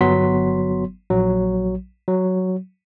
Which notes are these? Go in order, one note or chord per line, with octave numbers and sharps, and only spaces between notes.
G1 F#3 B3 C6 B6
A#1 F#3
F#3